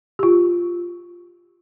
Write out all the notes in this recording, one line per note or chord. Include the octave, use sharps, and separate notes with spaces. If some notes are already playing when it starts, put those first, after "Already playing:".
F4 G4